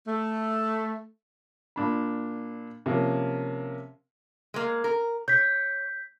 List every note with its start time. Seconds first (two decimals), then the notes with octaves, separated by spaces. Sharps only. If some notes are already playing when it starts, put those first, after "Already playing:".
0.07 A3
1.76 A#2 D4 B5
2.86 C3 F3 A#3 C#4
4.54 G#3 A#3
4.84 A#4
5.28 C#5 G6 B6